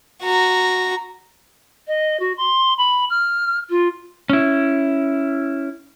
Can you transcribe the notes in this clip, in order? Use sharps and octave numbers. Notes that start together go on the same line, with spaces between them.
F#4 A#5
D#5
F#4
C6
B5
F6
F4
C#4 E4